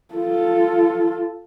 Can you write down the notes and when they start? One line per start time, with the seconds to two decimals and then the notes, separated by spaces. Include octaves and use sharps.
0.14 F4 A4